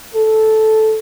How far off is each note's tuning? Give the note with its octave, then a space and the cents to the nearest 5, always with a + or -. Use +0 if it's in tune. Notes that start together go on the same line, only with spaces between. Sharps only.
A4 -10